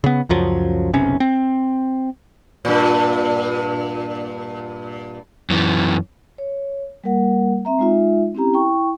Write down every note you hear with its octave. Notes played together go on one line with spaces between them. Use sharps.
C#3 B3
C#2 F#2 F3 F#3
F#1 B1 C3 C#4
C4
G2 A#2
F#2 E3
C#5
G3 A#3 A#4 F#5
C4 E5 A#5
G#3 D#4 F4 E5
C4 C#4 E4 G4 A#5
E4 G5 C#6